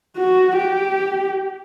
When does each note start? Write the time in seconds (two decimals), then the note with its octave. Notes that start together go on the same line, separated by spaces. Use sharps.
0.16 F#4
0.57 G4